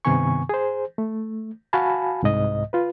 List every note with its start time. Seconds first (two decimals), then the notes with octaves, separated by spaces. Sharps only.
0.05 G2 C3 D#3 B3 G#5 C#6
0.49 G#4 C5
0.98 A3
1.73 F#4 F5 G#5 A5 B5
2.23 C2 G#2 D#5
2.73 F4 B4